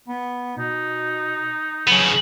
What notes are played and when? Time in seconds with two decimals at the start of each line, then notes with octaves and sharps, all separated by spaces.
0.09 B3
0.57 B2 D#4
1.87 C#3 F#3 B3